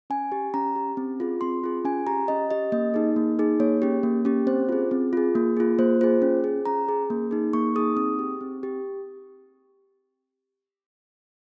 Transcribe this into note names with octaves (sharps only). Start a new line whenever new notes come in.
C#4 G#5
G4
C#4 A#5
G4
C4
F4 G#4
C4 C6
F4 G#4
C#4 G#5
G4 A#5
C#4 D#5
G4 D#5
A#3 D#5
D#4 G#4
A#3
D#4 G#4
A#3 C#5
C#4 G4
A#3
C#4 G4
C4 C5
F4 G#4
C4
F4 G#4
A#3
F4 G#4
A#3 C5
F4 G#4 C5
C#4
G#4
C#4 A#5
G#4
A#3
D#4 G#4
A#3 C#6
D#4 G#4 D#6
C4 D#6
G4
C4
G4